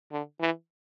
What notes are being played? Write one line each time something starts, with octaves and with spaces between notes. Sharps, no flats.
D3
E3